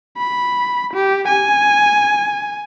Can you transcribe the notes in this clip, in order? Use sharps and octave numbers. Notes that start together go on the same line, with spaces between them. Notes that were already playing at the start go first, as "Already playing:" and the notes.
B5
G4
G#5